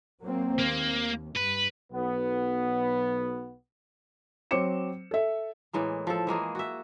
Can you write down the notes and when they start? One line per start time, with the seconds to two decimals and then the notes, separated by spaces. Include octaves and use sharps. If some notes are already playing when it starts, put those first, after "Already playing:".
0.21 F#3 A#3 C4
0.59 D#2 A#3
1.36 G2 B4
1.92 B1 B3
4.51 F#3 C4 C5 D6 C#7 E7
5.11 A4 E5
5.73 A2 E3 G#3 A#3
6.07 F3 A4
6.27 E3 G#3 A#3 G#4
6.55 F#4 E5